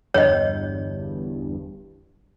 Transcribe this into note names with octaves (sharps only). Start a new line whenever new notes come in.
G1 E2 G2 C#5 D#5